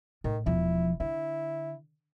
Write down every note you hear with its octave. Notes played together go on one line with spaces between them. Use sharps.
A2 D#3
E1 F3 E4
D3 E4